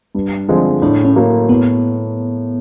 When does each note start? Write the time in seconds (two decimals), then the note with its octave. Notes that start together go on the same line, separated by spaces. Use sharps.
0.15 G2
0.48 D3 F3 G#3 C4
0.82 A2 D4
1.05 C#4
1.16 F#3 A#3
1.49 A2 B3